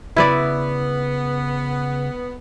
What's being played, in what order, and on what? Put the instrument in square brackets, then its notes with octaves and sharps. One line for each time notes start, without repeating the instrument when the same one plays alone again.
[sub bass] C#3 [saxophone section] B3 [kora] E4 B4 D5